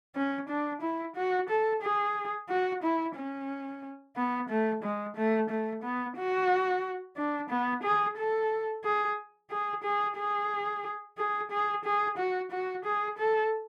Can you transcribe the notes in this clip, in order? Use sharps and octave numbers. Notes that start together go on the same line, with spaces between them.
C#4
D4
E4
F#4
A4
G#4
F#4
E4
C#4
B3
A3
G#3
A3
A3
B3
F#4
D4
B3
G#4
A4
G#4
G#4
G#4
G#4
G#4
G#4
G#4
F#4
F#4
G#4
A4